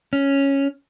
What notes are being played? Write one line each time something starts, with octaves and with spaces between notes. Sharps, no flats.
C#4